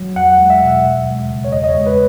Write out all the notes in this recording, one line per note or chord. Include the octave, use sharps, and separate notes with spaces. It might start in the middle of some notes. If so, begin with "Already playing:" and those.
Already playing: F#3
E2 F#5
G#3
E5
B2
D#2
G#3
C#3
C#5
E2 D#5
D#5
C#5
G#3
B4